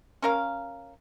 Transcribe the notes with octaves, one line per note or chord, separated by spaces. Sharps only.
C#4 A#4 F5